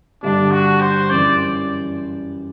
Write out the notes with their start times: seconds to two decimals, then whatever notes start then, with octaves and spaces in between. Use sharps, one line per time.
0.22 G2 D3 G3 D4
0.52 F#4
0.81 C5
1.10 F#2 E3 G3 D5